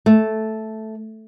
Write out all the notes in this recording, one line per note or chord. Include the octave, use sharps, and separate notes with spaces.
A3